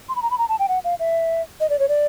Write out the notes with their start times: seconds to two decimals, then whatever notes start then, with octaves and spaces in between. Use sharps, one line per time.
0.09 C6
0.16 B5
0.22 A#5
0.31 B5
0.38 A#5
0.49 A5
0.59 G5
0.69 F#5
0.84 F5
1.00 E5
1.60 D#5
1.70 D5
1.79 C#5
1.89 D5